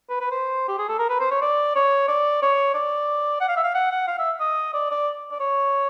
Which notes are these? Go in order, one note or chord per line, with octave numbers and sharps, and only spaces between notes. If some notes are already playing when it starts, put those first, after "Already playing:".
B4
B4
C5
G4
G#4
A4
A#4
B4
C5
C#5
D5
C#5
D5
C#5
D5
F#5
F5
E5
F5
F#5
F#5
F5
E5
D#5
D5
D5
D5
C#5